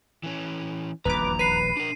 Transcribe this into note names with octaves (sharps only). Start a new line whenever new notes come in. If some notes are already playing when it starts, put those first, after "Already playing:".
E3 C#4
D#1 A#1 E2 B4 A#5 D6
B4 C7 D#7
D4 A#4